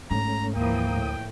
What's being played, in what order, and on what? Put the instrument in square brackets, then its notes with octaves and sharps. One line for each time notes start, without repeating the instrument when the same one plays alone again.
[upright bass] G#2 [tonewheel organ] A3 C#4 [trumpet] A#5
[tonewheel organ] D2 D#6 [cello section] E3 F3 A#3 [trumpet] G5
[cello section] A2